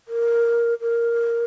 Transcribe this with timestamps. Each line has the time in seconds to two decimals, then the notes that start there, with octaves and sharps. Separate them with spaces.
0.08 A#4
0.81 A#4